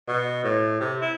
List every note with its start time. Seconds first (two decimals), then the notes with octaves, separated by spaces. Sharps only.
0.08 B2
0.43 A2
0.80 C3
1.01 E4